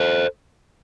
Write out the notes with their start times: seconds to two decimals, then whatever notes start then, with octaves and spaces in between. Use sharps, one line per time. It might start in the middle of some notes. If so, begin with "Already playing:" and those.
Already playing: A4 C5